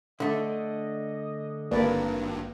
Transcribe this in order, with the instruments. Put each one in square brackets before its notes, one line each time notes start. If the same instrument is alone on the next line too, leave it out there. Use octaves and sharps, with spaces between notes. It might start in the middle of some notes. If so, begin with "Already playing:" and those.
[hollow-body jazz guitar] D3 A3 D4 [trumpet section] D#5
[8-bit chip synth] G#1 G2 [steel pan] A#3 B4 D5